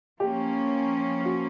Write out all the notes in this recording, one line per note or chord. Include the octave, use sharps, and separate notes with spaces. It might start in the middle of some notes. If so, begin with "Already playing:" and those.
F3 A#3 C#4 G4
F#4